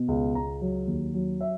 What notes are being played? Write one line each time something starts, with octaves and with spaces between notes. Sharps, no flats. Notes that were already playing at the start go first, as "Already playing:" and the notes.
Already playing: B2
C#2
C#2 A#5
F#3
D#2
F#3
E5